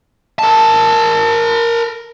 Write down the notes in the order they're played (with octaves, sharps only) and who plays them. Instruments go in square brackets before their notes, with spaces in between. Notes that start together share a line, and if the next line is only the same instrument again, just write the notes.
[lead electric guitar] A#4 A5